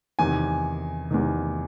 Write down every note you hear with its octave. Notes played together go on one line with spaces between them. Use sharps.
E2 C3 D#3 G#5
E2 C3 D#3